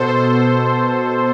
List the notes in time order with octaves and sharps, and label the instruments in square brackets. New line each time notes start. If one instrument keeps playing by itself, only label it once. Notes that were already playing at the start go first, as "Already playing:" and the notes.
Already playing: [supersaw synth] B2 A4 C5